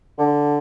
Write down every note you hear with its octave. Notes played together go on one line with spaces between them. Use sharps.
D3